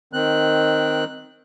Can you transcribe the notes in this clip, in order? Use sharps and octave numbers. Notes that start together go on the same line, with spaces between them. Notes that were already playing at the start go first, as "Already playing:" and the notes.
D#3 C4 F#6